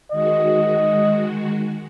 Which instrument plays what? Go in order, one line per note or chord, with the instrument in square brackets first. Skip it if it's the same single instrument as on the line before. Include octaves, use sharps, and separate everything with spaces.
[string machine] D#3 G#3 F#4 [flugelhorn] D#5